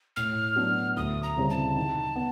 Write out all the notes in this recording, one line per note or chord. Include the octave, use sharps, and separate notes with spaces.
A2 F6
F#3 B3 D4
D2 D#6
A#5
C#3 E3 G3 C4
A5
D#3
B3